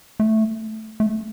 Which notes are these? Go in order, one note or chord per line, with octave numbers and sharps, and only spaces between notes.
A3
A3